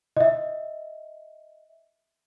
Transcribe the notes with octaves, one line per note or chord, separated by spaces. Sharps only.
D#5 E5